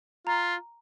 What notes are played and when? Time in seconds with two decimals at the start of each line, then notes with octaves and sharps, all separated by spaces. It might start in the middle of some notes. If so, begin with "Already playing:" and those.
0.27 F4 A#5